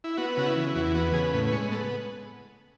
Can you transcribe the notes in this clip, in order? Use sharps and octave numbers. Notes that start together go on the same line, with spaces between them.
E4
B3 F#4
C#3 F#4
E4
E3
E2 F#4
B3 F#4
C#3 G#4
A2 B4
B4
G#3 C#5
B3 A4